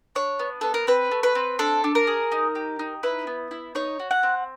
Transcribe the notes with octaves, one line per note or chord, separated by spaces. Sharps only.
D4 C#5
B3
B3 A4
A#4
C4 B4
A3
B4
C4
D4 A4
D4
A#4
G#4
D#4
G4
D#4
E4 B4
B3
E4
D#4 C#5
F#4
F#5
C4